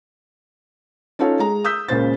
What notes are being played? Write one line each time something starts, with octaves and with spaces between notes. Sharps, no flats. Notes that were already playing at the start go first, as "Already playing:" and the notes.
C#4 D#4 F4 A4 C#5
G#3 A#5
D#6 E6 G6 B6
C#2 A#2 C#3 C#4 C5 A6